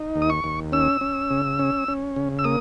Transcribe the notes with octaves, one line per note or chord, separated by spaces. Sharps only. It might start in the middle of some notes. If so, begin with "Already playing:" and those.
Already playing: D#4
D#2
D#6
C#6
D#2
C#4 E6
C#4
C#3
C#4
C#4
C#3
E6
A#3 D#6